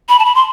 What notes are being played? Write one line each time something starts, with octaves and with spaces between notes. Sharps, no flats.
B5
A5
B5
C6